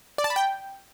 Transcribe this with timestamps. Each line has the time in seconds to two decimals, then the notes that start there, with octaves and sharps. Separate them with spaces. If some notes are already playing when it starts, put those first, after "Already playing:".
0.18 D5
0.24 A5
0.30 B5
0.36 G5